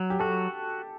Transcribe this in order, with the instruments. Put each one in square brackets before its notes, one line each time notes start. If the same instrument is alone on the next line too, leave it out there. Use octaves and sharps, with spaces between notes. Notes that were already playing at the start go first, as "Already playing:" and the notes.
Already playing: [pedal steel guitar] F#3
[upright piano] G4
[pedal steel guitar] F#4 [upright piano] A4